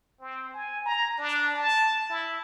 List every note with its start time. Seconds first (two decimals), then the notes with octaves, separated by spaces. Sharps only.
0.21 C4
0.54 G#5
0.86 A#5
1.18 D4
1.55 A5
2.10 E4